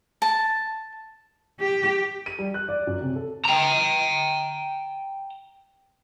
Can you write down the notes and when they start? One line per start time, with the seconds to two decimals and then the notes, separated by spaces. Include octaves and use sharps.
0.22 A5
1.60 G4
2.26 D#7
2.39 G3
2.54 F#6
2.69 D5
2.87 F#2
3.02 C3
3.16 A4
3.45 G5 A#5